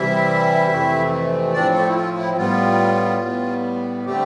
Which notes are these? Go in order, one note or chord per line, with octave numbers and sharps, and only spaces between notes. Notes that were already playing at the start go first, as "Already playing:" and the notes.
Already playing: C3 E3 G3 C4 E4 E5
F2 C3 E3 A3 C4
A2 F3 C4 D4 D5
A3 A4
E4
F4
E4
A2 G3 B3 F4
A2 G3 B3
D3 G3 A3 C4 G4